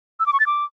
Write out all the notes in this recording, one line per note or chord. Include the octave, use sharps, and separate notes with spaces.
E6
D6
C#6
A6
D6